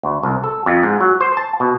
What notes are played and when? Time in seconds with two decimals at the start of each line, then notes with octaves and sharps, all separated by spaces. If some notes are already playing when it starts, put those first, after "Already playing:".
0.03 D2
0.23 C2
0.44 A4
0.66 F2
0.83 G#2
1.00 F#3
1.21 C5
1.37 A5
1.60 B2